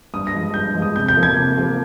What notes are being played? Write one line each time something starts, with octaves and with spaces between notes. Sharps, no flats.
G2 D#6
A#6
F3 G#3
G2 G6
F3 G#3
D#6
C3 G6
G6
F3 A#3
G#6
C3
F3 A#3